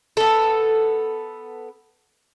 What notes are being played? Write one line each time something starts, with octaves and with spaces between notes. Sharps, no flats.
B3 A4